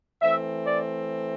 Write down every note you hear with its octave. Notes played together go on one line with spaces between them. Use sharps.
E3 A3 C4 E5
D5